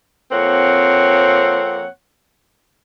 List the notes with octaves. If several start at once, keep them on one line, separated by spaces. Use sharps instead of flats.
F2 A#3 C4 C#5 F#5